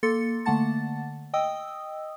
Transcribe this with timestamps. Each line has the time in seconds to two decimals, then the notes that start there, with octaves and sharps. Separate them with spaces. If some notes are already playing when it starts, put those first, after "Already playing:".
0.03 A#3 A4 C6 A6 C#7
0.45 D3 A3 A#3 F#5 A5 A6
1.33 D#5 G5 D#6 E6